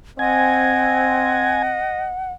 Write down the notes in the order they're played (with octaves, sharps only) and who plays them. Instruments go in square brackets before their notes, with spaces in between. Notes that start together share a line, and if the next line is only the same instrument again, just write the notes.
[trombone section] C4 [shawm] D#5 [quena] F#5 [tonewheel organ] G#5